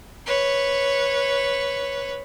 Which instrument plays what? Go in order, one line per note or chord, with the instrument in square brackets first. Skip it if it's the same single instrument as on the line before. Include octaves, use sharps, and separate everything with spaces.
[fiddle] B4 C#5